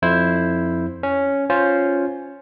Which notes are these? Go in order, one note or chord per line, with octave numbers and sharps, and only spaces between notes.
F2 E4 C5
C#4
C#4 F4 C5